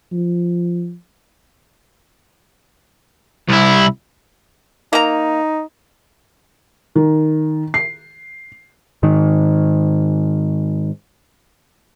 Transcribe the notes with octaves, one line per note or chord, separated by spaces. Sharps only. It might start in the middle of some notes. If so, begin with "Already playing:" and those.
F3
C2 E4
A#3 D#4 A#5
D#3
C7
G#2 D#3